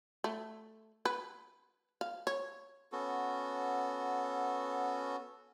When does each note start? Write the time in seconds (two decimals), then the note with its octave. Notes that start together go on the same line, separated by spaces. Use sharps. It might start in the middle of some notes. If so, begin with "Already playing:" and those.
0.24 A3
1.05 B4
2.01 F5
2.27 C#5
2.92 B3 C#4 F#4 A4